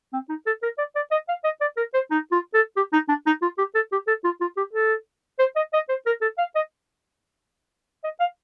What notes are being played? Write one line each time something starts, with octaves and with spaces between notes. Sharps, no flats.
C4
D#4
A4
A#4
D5
D5
D#5
F5
D#5
D5
A#4
C5
D#4
F4
A4
G4
D#4
D4
D#4
F4
G4
A4
G4
A4
F4
F4
G4
A4
C5
D#5
D#5
C5
A#4
A4
F5
D#5
D#5
F5